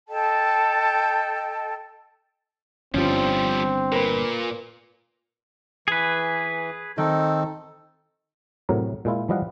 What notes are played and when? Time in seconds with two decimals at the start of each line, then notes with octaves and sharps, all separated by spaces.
0.08 A4 D#5 G5 A5
2.94 G1 G2 F3 G3 C4 C#4 F4
3.92 A#2 A#4 B4
5.88 E3 G#4 B4
6.98 D#3 C4 D#4 A4
8.69 A2 C3 F#3 A#4 A#5
9.05 A#2 G#3 E4 F4
9.29 E3 F3 G3 D#5 F5 F#5